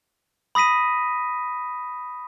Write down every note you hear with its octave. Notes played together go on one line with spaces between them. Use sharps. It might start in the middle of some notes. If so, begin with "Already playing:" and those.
B5 D#6 A#6 B6 D#7